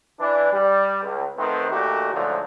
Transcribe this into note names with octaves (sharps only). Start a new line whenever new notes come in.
E3 D4
G3
C#2
D#3 A3 B3 C4 C5
A#2 D#3 A3 F#4 G4
G#2 D3 F3 F#3 A3